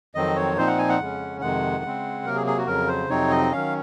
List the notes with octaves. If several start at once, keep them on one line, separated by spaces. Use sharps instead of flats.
F2 D#3 F#3 C4 D#5
C#5
A#2 F3 C4 D#4 C5
F#5
G#5
F#5
F2 C#3 G#3 C#4
F2 C3 D#3 G#3 F#5
C#3 G#3 C4
C3 F#3 A#3 A#4
G#4
G#4
F#4
F2 C#3 F#3 A#4
C5
F2 C3 F#3 C4 D#4 C#5
D#5
D#3 F#3 C#4 F5